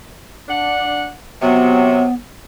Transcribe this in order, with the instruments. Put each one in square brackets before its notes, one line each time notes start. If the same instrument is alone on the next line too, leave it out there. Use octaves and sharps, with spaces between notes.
[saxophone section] D4 F#5
[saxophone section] C3 F#3 [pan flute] B3